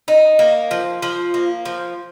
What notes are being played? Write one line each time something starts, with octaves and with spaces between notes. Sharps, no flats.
D#4
A#3
F3
F3
A#3
F3